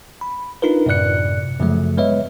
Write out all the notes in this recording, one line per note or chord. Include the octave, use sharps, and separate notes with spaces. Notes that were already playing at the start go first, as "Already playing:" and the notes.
B5
D4 D#4 F4 A#4 B4
F#2 A2 C3 D5 F#6 C#7
F#2 C#3 F3 F#3 A3
G#3 B3 B4 C#5 D#5 E5